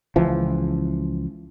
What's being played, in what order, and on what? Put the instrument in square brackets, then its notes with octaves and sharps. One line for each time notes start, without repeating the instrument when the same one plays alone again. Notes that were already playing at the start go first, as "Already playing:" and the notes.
[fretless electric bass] C#2 E3 F3